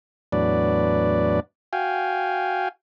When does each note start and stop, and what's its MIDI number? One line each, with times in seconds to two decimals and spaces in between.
0.32 1.40 40
0.32 1.40 45
0.32 1.40 54
0.32 1.40 62
0.32 1.40 71
0.32 1.40 74
1.73 2.69 66
1.73 2.69 77
1.73 2.69 79
1.73 2.69 80